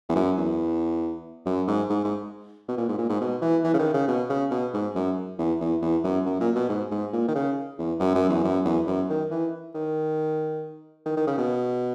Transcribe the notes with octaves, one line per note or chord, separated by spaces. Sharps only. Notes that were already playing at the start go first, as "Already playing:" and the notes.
E2
F#2
E2
F#2
G#2
G#2
G#2
B2
A#2
G#2
A#2
G#2
B2
E3
E3
C#3
D#3
C#3
B2
C#3
B2
G#2
F#2
E2
E2
E2
F#2
F#2
A#2
B2
G#2
G#2
A#2
D#3
C#3
E2
F#2
F#2
E2
F#2
E2
F#2
D#3
E3
D#3
D#3
D#3
C#3
B2